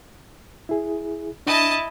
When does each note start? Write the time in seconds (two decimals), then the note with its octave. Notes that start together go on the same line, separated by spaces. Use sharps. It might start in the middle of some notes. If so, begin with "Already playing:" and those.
0.69 E4 G#4
1.47 D4 E4 D#5 A5